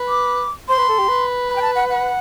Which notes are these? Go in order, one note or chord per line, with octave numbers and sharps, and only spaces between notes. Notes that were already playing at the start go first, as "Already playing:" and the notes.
Already playing: B4
D6
C5 C6
B4
A4
G4
B4
B5
G5
A5
F#5
F#5